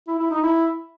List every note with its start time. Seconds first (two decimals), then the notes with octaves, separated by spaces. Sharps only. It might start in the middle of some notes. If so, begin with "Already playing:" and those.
0.07 E4
0.19 E4
0.31 D#4
0.43 E4